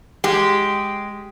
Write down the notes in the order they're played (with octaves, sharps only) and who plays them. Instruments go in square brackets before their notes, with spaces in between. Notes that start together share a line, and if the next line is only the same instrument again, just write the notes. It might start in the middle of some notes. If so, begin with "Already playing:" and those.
[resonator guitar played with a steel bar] G#3 G4